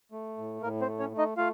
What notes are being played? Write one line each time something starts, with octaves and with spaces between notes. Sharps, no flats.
A3
A2
A2 A#3 A#4
C4 C5
A3
C#4 C#5
A3
D#4 D#5
A3 F4 F5